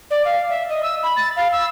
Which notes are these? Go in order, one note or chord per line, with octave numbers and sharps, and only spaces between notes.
D5
F5
E5
D#5
E6
B5
A6
F5
E6